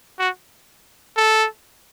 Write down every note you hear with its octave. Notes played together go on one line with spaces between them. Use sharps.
F#4
A4